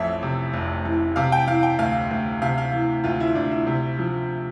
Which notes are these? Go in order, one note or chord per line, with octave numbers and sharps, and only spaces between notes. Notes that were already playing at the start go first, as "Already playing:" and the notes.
Already playing: A1 F2 E5
C3
F1
E3
C3 F5
G5
E3 F5
G5
D2 F5
D2
C3 F5
F5
E3
D2 F4
E4
D2 D4
E4
C3
F3